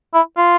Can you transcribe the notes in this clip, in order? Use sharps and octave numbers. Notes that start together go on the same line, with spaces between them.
E4
F4